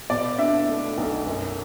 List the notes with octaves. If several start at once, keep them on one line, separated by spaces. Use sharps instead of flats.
B2 D5
D4 E5
A3
B1
F#2